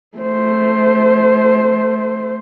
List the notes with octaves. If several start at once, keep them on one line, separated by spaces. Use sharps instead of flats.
A3 C5